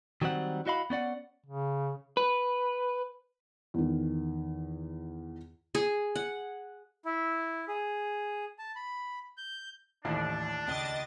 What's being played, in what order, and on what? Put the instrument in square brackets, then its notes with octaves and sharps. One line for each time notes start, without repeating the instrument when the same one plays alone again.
[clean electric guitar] D#3 F#3 G3 C4 F#5
E4 F#4 D#5 F5 B5
B3 C#4 D5 F#5
[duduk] C#3
[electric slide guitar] B4
[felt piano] E2 D#3
[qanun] G#4
F#5
[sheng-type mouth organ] E4
G#4
A5
B5
G6
[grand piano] A1 [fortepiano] D#2 A2 [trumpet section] D4
[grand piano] C#2 G7 [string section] D#5 A6